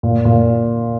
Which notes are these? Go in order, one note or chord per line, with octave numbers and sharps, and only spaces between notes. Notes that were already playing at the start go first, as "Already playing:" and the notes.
A#2
A#2